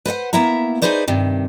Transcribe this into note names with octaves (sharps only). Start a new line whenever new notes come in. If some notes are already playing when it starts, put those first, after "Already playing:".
B4 C5 D#5 F#5
A#3 B3 E4 E5 A#5
D#4 E4 G#4 B4 C5 D5
G2 C3 D#3